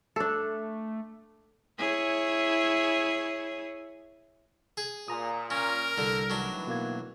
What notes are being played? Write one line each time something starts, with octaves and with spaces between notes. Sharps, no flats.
A3 D4 A4
E4 G#4 C#5
G#4
A#2 G#5 A#5 D#6
C#4 A#4
C2 D3
A2 D#3 E3 F#3 D4
B2 A#3 G#6